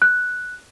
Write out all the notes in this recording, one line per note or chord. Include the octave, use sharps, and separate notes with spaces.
F#6